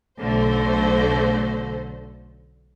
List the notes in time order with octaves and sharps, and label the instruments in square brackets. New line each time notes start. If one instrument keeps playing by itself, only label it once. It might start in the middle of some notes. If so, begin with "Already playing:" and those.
[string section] B1 D3 A3 C5